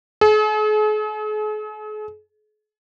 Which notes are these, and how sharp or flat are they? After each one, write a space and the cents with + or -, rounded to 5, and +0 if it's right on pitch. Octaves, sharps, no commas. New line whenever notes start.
G#4 +45